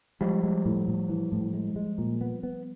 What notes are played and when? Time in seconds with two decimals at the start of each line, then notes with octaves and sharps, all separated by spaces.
0.21 F3 G3 G#3
0.44 G#3
0.66 A2
0.88 A2
1.09 E3
1.32 A2
1.54 G#3
1.76 G#3
1.98 A#2
2.21 B3
2.43 B3